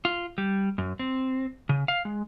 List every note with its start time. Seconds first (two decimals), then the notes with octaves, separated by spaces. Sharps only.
0.05 F4
0.38 G3
0.78 F#2
0.99 C4
1.69 C#3
1.88 F5
2.05 G#3